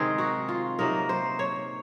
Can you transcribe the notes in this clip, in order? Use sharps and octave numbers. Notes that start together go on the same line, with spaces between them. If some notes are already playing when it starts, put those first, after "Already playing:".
Already playing: C3 D#3 G#3 C4 D#4 G#4
F#4
F4
C3 F#3 A#3 D#4 A#4
C5
C#5